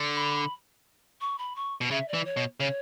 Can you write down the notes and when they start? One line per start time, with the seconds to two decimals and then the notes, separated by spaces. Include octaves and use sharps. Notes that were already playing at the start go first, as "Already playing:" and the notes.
Already playing: D3
0.15 B5
1.21 C#6
1.38 B5
1.56 C#6
1.81 B2
1.91 C#3 E5
2.08 D5
2.14 E3
2.25 C#5
2.37 B2
2.60 C#3 C#5